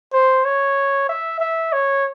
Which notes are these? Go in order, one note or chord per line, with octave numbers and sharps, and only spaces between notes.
C5
C#5
E5
E5
C#5